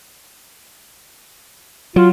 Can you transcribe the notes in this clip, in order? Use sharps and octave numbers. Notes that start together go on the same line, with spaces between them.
F#3 F4